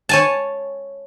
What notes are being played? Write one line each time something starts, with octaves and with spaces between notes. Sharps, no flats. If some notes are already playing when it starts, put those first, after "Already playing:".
C#5 G#5 A5